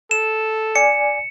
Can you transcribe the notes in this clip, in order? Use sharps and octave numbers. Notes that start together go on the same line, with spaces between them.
A4 E7
D5 G#5 C#7